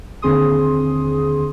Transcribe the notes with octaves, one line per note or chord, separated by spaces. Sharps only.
D#2 D3 C4 G#4 C6 D#6